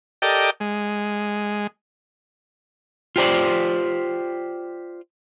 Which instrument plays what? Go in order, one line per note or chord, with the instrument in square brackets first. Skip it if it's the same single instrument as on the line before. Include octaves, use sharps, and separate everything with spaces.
[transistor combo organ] G4 A4 A#4 D5 D#5 G5
G#3
[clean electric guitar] F4 G4 C5 D5